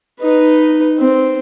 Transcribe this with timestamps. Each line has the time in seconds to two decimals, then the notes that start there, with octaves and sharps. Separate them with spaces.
0.21 D#4 B4
0.99 C4